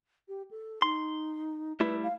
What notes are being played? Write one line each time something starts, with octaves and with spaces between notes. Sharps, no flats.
G4
A4
D#4 C6
G3 A3 E4 B4
F5